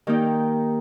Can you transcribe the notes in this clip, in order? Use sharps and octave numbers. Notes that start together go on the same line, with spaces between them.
D#3 A#3 D#4 G4